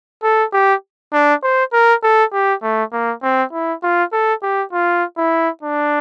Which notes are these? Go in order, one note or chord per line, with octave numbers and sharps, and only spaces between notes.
A4
G4
D4
C5
A#4
A4
G4
A3
A#3
C4
E4
F4
A4
G4
F4
E4
D4